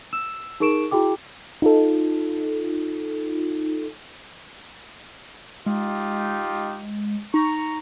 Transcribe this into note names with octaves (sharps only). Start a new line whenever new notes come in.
E6 E7
D#4 G#4 A#4 C#6 D7 E7
E4 F#4 G#4 G5 D6
D#4 F4 A4
G#3 D#4 F4 G4
D#4 A#5 C#6